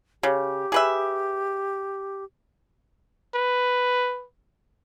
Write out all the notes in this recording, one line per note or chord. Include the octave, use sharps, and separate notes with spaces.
C#3 G4
G#4 B4 E5
B4